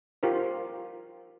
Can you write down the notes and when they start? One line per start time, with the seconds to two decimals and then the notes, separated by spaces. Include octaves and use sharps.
0.23 F4 G4 A#4 C5